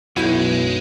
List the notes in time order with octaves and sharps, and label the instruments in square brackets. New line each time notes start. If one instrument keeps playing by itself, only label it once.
[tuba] B1 [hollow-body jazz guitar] F#2 F#4 [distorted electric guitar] G#3 [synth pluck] E4 E5 G6